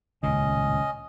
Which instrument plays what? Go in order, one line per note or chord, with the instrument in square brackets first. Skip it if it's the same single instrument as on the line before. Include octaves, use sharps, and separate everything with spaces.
[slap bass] D#1 C#2 A2 [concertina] C#4 D#5